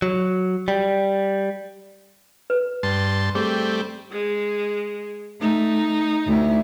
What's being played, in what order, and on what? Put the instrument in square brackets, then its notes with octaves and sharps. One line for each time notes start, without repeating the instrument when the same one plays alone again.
[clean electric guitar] F#3
G3
[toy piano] B4
[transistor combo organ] G2 A5 C6
[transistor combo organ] G3 A3 C4 [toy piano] G#4
[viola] G#3
[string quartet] A3 [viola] D#4
[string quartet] D2 E4